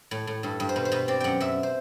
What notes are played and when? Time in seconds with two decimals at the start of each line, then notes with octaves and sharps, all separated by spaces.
0.11 A2
0.27 A2
0.43 G2 A4
0.60 G2
0.69 C5
0.76 B2 B4
0.85 C5
0.92 B2 B4
1.08 C4 D5
1.20 F#2 F#5 G5
1.40 F#2 E5
1.63 C5